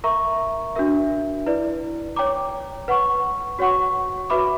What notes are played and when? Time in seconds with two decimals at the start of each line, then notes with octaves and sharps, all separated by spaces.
0.04 A#4 E5 A#5 C#6
0.76 D4 F#4 A#4 E5
1.46 E4 B4 D5
2.16 C#5 G5 A#5 D6
2.88 B4 F#5 C#6
3.59 F#4 C#5 F#5 C#6
4.30 F#4 B4 E5 B5 D6